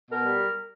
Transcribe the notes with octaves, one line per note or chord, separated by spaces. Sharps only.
B2 A#4
G3